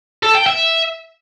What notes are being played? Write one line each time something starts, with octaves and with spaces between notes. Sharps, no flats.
A4
G5
E5